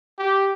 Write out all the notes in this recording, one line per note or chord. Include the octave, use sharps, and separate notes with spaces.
G4